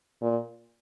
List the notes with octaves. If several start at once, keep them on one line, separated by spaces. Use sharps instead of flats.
A#2